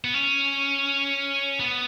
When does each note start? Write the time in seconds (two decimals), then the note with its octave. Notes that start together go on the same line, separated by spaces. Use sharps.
0.04 B3
0.14 C#4
1.60 B3